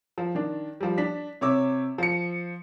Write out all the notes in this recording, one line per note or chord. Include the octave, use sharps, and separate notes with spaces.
F3
D#3 D4
F3 G3
D4 B6
C3 C#5 D6 E6
F3 C#7